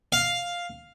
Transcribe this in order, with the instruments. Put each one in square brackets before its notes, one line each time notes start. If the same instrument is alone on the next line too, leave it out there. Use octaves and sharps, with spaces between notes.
[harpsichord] F5